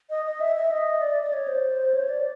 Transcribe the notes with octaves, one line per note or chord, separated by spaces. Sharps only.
D#5
D#5
E5
E5
D#5
D5
D5
C#5
C5
C#5
D5